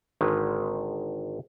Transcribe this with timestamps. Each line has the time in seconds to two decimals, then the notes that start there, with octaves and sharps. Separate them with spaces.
0.21 G#1 D3 D#3 G#3 B4